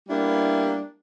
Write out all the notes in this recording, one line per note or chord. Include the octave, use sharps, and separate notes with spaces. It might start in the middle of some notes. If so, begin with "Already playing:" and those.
G3 A#3 B3 D4 E4